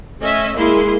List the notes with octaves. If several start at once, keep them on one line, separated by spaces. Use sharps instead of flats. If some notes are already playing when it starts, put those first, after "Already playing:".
A3 C#4 D#5 E5
G#3 A#3 E4 G#4 C6